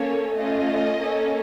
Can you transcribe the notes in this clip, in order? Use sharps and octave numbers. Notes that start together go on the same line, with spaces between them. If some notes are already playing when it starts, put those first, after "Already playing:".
Already playing: A#3 C#4 A4 C#5
A3 C#4 F4 D#5
A#3 C#4 A4